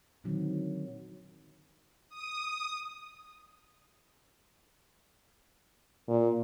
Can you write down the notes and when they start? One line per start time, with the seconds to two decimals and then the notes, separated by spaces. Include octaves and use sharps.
0.24 A#2 D3 D#3 F#3 G#3 C4
2.09 D#6
6.08 A#2